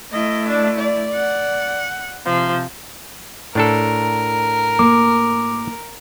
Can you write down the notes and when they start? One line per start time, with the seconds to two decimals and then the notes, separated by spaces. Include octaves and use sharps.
0.12 A3 E4 D#5
0.49 D4
0.78 D5
1.15 F#5
2.26 C3 F3
3.55 A2 D4 A4 A#4
4.79 A#3 D6